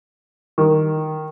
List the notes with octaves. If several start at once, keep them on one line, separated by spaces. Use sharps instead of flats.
D#3